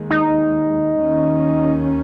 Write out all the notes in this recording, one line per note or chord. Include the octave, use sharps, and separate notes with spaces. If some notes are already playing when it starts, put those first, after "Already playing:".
Already playing: D#2 D#3 G#3
D#4
D#2 D#3 C#4